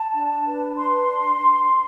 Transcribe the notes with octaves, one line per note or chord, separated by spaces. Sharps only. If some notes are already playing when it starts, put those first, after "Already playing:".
Already playing: A5
D4
B4
D4 C6